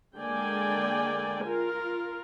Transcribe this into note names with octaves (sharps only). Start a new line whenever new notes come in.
D3 G#3 A#3 D5 G5 G#5
F4 A#4